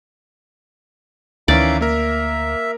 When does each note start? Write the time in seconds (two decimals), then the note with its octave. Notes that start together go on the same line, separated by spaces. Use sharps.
1.48 D2 D#3 E3 C#4 D5 E5 F5 A#5
1.81 A#3 A#4 E5